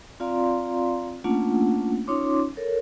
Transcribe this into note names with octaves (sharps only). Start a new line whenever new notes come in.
C4 F4 D5 F5 A#5 C6
A3 A#3 C#4 D4 F4 F#5
C#4 D#4 F4 C#5 C6 D6
A4 A#4 C#5